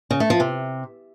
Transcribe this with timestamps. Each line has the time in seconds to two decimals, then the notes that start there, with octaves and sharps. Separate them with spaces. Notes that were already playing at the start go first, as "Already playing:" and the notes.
0.11 C#3
0.20 A3
0.30 F3
0.40 C3